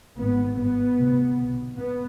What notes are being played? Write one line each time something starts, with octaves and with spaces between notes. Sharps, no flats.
G#1 G#2 B3
G#1 G2 B3
D2 C3
B1 B2
B3